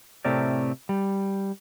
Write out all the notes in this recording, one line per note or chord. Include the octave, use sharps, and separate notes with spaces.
A2 C3 A3 C4 A#4 D5
G3